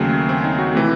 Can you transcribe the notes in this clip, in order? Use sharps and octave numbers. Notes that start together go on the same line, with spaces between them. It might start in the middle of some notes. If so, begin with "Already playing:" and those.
Already playing: D#2 C#3 F#3 A3
C4
D#4
F#4
C3 E3 A3